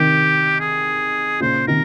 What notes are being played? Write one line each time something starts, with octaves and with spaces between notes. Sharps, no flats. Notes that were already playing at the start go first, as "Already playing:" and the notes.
Already playing: C3 D#3 G4
G#4
A#2 C#3 C5
C3 D#3 A#4